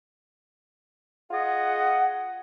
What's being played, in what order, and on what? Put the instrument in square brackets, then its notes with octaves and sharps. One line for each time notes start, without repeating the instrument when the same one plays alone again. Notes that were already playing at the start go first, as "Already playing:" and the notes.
[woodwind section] F4 G#4 D#5 F#5